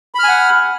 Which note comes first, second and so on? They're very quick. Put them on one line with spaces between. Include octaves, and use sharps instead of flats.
B5 F6 G#5 F#5